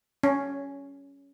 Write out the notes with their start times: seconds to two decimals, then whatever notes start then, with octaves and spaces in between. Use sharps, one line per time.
0.23 C#4